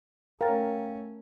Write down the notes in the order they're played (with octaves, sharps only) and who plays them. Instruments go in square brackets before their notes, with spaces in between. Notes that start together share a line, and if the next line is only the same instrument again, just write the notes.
[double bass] A3 C#4 [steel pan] A#4 [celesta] F5 G5 A6